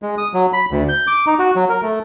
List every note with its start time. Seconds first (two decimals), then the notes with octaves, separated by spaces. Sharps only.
0.02 G#3
0.18 D#6
0.34 F#3
0.53 B5
0.71 D2
0.89 G6
1.07 D6
1.27 D#4
1.39 F#4
1.56 F#3
1.69 A#4
1.82 A3